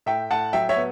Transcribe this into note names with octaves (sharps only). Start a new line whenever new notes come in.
A2 E5 G5
A2 F#5 A5
F#3 E5 G5
C#5 E5
B3